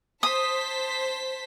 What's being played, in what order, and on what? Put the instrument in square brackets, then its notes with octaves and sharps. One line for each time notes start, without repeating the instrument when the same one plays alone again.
[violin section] C5 A5 B6 [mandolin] D#6